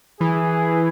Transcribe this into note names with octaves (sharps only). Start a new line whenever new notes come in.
E3 G#4